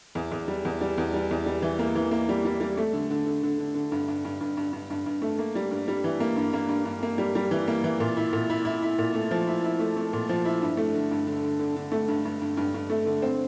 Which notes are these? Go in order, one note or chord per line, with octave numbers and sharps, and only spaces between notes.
E2
E2
G3
E2
G3
E2
G3
E2
G3
E3
A#3
E3
A#3
G3
G3
G3
A3
D3
D3
D3
D3
D3
D3
G2
G2
G2
G2
G2
G2
G2
G2
A3
A#3
G3
G2
G3
E3
A#3
G2
A#3
G2
G2
A#3
G3
G3
E3
A#3
E3
A#2
E4
A#2
E4
E4
E4
A#2
A3
F3
E4
E4
A3
A3
A#2
F3
E4
G2
A3
D3
G2
D3
D3
D3
D3
A3
G2
G2
G2
G2
G2
A3
D3
C4